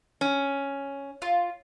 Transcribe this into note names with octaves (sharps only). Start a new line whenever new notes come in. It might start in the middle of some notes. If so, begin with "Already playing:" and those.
C#4
F4